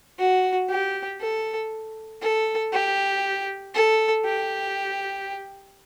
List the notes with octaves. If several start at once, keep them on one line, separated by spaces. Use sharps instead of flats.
F#4
G4
A4
A4
G4
A4
G4